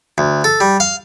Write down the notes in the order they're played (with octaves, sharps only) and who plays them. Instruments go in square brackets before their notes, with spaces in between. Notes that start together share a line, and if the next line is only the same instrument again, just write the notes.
[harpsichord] D2
A4
G3
F5